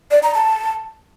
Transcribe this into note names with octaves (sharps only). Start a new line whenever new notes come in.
D5
A#5
A5